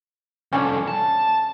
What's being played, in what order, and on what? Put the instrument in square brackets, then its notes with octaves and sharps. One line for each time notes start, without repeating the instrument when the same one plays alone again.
[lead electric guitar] C2 F2 [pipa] C#4 D4
[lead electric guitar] A5